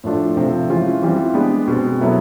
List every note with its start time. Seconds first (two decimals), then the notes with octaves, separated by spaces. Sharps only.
0.04 A2 F3 A3 D4 F4
0.36 C3 F3 A3 C4
0.69 E3 G#3 C#4 F4
1.02 E3 G3 C4 F4
1.34 G#3 B3 D4 G4 B4
1.67 B2 G#3 C4
2.00 F#3 B3 E4 A4